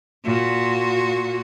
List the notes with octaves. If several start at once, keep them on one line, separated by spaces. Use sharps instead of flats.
A#2 F#4